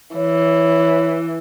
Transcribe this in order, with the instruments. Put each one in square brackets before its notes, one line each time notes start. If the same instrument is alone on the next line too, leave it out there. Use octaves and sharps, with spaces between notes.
[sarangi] E3 [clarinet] C#5